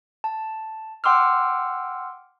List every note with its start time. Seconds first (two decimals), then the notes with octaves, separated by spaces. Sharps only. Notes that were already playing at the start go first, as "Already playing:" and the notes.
0.24 A5
1.04 F#5 G5 C6 D6 E6 F6